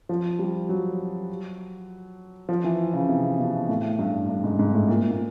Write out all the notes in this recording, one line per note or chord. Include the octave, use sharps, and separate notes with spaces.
F3
G3
F#3
F3
E3
C#3
C3
B2
A2
G2
G2
G#2
G#2
A2
A#2
A#2